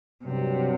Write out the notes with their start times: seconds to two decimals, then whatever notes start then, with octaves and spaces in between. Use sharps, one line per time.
0.24 G2 C3 F#3 C4